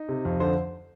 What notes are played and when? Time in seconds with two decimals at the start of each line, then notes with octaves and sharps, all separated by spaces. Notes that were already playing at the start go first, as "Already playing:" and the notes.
Already playing: D#4
0.08 C3
0.25 F2
0.40 D3 C5